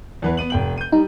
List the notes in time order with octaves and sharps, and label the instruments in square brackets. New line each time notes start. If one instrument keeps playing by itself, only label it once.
[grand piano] E2 E3 B4
B3 D#7 F#7
F1 G5 F#7
G6 D#7
[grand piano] G3 [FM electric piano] D#4